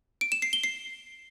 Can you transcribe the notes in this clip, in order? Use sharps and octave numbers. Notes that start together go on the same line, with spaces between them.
D7
E7
C7
G7
C7